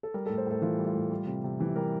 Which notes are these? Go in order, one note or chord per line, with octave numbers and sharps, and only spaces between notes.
A4
G3 A#4
A2 A4
C5
A2 A4
E3 F4
G3
F4
A2
G3
C3
C3
E3 G4
G3 A#4